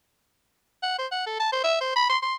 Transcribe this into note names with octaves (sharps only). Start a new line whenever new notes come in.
F#5
C5
F#5
A4
A5
C5
E5
C5
B5
C6
C6